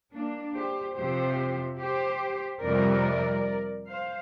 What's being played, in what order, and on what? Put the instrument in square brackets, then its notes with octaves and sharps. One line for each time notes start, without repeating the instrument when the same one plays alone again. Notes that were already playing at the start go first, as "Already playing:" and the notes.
[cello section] A#3 D4
G4 C5
F2 C3 F3 G4 C5
G4 C5
F2 C3 G3 A#4 D5
C5 F5